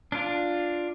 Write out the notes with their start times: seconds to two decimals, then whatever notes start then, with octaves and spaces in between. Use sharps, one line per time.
0.12 D4 F4